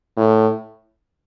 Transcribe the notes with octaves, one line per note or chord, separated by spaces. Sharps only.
A2